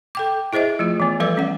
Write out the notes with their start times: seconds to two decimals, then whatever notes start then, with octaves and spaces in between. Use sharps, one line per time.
0.15 A4 G5 D6
0.53 E4 G#4 C5 D#5 E5
0.79 F3 A3 F4
1.00 E3 B3
1.20 F3 G3 A4 B4 D5 D6
1.37 C#4 F#5